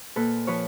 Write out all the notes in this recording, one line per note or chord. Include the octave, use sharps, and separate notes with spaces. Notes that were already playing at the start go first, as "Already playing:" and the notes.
A#2 A4 B4
F3 B4 C#5